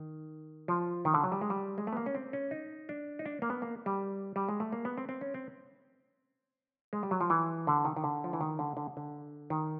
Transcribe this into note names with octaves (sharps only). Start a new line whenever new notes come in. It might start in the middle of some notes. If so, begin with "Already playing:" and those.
Already playing: D#3
F3
D#3
D3
F#3
G3
G#3
G3
G#3
A3
B3
A#3
C#4
C4
C#4
D#4
D4
D#4
D4
A#3
B3
A#3
G3
G3
G#3
A3
A#3
B3
C4
C4
C#4
C4
G#3
G3
F#3
F3
E3
D3
D#3
D#3
D3
F3
E3
D#3
D3
D3
D3
D#3